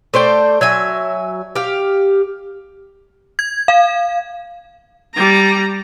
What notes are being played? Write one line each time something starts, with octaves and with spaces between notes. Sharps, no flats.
A3 C5 D5 G5
F#3 E5 G#5
G4 F5
G#6
F5
G3 A#5